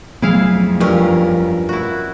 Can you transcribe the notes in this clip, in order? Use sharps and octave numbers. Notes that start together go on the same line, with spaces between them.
F2 F#3 A3 B3 E4 G#4 F5
G2 C#4 F4 A#4
E4 F#4